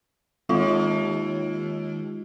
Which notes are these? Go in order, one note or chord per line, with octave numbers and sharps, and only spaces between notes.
D#2 G#3 F4